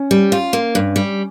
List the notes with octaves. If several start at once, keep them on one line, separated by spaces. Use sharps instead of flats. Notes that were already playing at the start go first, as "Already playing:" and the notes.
Already playing: C#4
G3
F4
A#3
G2
G3